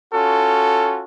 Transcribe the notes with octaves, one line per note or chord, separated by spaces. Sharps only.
C#4 F4 F#4 A4